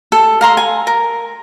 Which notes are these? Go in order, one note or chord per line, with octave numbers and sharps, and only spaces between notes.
A4
F5 A#5 C6
G#5
A#4